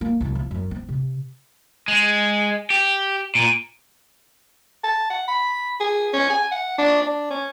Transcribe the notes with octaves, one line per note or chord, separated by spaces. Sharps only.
A#3
C2 F#2
F3
F#2
C4
C3
G#3
G4
A#2
A5
F#5
B5
G#4
C#4
G#5
F#5
D4
D4
C#4